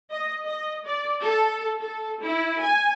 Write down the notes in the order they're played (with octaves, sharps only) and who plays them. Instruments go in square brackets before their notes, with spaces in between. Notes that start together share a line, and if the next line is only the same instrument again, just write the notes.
[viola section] D#5
D#5
D5
A4
A4
E4
G#5